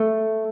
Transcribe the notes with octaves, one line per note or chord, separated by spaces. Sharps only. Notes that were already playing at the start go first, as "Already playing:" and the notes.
Already playing: A3